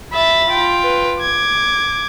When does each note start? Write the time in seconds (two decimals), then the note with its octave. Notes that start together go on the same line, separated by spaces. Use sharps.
0.13 E5 B5 A6
0.49 F4 G5
0.83 B4
1.21 D6 G#6